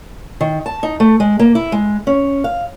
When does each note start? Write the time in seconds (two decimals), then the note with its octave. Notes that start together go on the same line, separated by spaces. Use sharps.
0.41 D#3
0.66 A5
0.83 D#4
1.00 A3
1.20 G#3
1.39 A#3
1.55 E4
1.72 G#3
2.07 C#4
2.44 F5